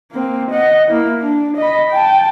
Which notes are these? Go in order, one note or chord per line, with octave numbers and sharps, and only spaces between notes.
A#3 C4
D#5 F#5
A#3 E4
D4
D#5 B5
G5 A5